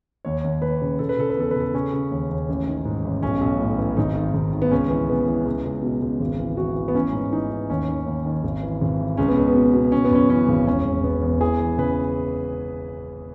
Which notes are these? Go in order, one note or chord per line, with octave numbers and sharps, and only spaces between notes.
D#2 C#5
D#2
D#2 B4
C#3
C#3 A4
B4
C#3 A4
B4
E2 A4
C#3 B4
A4
C#3 C#4
C#3
D#2
D#2
A1
D#3
G#2
A1
B1 C#4
B1
A2
E3
G#1 D#4
D#3
G#1
D#3
B3
C#2 C#4
E3
C#3 B3
E3
C#2
C#2
B2
C#2
G#1
E3
E3 F#4
E3
B3
A1 C#4
G#2
E3 D#4
E3
D#2 C#4
D#3
D#2
D#3
G#1
E3
G#1
E3
C#2 C#4
B3
C#2
B3
B2
B2
C#3 C#4
B3
F#2 C#4
E3 C#4
G#1
E1 C#4
E1
E1 B3
E2
E3 G#4
E3
C#3 B4